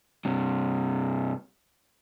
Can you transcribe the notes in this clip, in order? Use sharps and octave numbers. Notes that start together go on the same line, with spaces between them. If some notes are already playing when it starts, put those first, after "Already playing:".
G2 C3